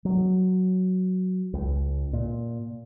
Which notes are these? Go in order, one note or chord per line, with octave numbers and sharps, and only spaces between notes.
F#3
C#2
A#2